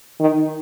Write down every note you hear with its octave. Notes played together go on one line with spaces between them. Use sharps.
D#3